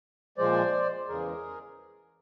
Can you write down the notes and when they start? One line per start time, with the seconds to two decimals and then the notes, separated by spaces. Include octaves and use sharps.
0.38 A#2 F3 G#3 C5 D5
1.08 E2 C#3 E3 G#3 G#4 A#4